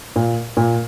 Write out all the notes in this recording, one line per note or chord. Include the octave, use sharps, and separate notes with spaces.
A#2
A#2